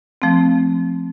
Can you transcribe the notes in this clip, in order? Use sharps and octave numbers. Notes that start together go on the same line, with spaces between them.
F3 A3 C4